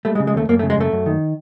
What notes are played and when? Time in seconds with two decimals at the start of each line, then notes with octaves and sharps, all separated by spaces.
0.05 G3 A3
0.15 G#3
0.20 C#3
0.27 G#3
0.34 D#2 A3
0.49 F#2 A#3
0.59 A3
0.63 C#3
0.70 G#3
0.77 F#2 A3
0.92 F#2
1.06 D#3